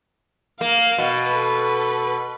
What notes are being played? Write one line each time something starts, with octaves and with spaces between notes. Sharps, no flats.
A#3 F5
B2
A4 B4